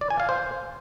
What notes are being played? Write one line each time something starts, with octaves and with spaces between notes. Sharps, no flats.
D5
G#5
F5
C5